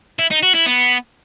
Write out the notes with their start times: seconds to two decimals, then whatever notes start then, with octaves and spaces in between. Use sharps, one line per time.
0.19 E4
0.31 D#4
0.42 F#4
0.54 E4
0.66 B3